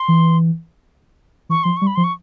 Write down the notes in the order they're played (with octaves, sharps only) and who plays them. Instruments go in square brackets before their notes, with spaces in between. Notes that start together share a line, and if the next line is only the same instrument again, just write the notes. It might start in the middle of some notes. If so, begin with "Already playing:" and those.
Already playing: [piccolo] C6
[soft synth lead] E3
[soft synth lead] E3 [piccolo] C#6
[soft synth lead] F3 [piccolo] C6
[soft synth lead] G3 [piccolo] C#6
[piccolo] B5
[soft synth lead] F3 [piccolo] C6
[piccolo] C#6